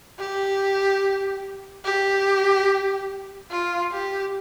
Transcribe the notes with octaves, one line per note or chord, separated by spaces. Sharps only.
G4
G4
F4
G4